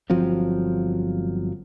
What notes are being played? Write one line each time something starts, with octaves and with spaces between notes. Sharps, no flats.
G1 F3 F#3 C4